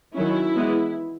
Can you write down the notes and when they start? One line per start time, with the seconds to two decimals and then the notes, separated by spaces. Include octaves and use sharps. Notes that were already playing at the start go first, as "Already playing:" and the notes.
0.14 D#3 F#3 C#4 E4
0.55 E3 G#3 B3